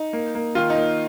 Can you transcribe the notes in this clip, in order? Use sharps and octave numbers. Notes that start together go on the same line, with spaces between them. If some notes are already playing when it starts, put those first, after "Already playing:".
Already playing: D#4
A#3
A#3
D#3 F4
D#4
A#3